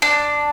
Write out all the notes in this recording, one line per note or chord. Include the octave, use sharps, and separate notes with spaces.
D4